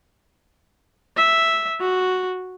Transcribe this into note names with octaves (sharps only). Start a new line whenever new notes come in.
E5
F#4